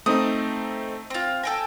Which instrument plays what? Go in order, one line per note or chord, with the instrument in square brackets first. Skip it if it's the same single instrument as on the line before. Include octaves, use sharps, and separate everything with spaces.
[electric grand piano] A3 C4 D#4 [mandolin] D#6
[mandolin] C4 F4
[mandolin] A4 G5 G#5 [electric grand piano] A#6